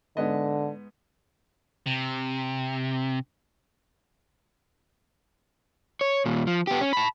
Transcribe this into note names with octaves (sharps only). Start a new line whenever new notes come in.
G#2 D3 B3 D#5
C3
C#5
D#2 A#2
F3
B3 G4
C#4
A5 B5